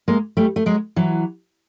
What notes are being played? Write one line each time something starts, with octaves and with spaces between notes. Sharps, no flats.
G#3 A#3
G3 A3
A3
F#3 G#3
E3 F#3